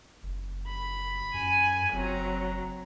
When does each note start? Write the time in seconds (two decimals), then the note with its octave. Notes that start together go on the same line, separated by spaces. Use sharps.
0.23 F#1
0.67 B5
1.34 F#2 G#5
1.93 F#1 F#3 C4 A#5